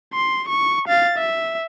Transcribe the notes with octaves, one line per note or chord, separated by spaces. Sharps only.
C6
C#6
F5 A6
E5